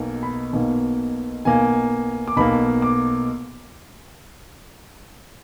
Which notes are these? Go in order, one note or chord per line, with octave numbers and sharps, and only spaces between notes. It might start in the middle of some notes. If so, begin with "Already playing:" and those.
Already playing: B1 B2 A#3
B5
B1 B2 A#3
B1 B2 A#3 G#5
D6
B1 B2 A#3 B5
D6